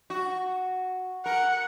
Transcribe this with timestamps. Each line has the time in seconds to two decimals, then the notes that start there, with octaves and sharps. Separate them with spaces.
0.10 F#4
1.26 A#4 F#5